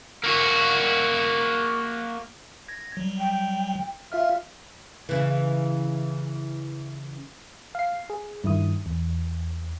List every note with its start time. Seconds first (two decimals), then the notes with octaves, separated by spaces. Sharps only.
0.24 A#3 F#4
2.69 G#6 A#6
2.97 F#3 G3
3.18 G5
4.12 F4 E5 F5 F6
5.09 C#3 E3
7.75 F5 C7
8.10 G#4
8.44 G2 D#3 E4 D#6
8.86 E2